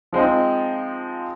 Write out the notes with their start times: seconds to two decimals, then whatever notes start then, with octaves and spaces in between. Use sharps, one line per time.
0.13 F3 G#3 C4 D#4